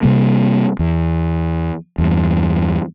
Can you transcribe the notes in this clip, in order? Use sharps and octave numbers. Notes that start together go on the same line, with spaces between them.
C3 G3 A#3
E2
E2 G2